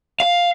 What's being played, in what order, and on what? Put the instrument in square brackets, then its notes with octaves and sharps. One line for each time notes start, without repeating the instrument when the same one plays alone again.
[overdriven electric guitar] F5